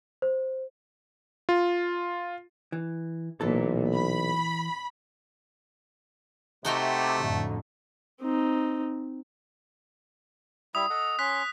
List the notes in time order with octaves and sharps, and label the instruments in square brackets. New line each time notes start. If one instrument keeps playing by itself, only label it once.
[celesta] C5
[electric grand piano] F4
[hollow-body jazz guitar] E3
[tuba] B1 [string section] A#2 [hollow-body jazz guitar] E3 A4
[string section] B5
[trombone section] C3 [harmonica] A3 [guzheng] D#4 F#4 G5
[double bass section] F2 A2 D3
[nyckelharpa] C4 D#4
[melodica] G3 E4 E5 [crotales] D#6
[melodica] A4 D#5 F#5
[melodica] C#4 C6 [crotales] F#6 B6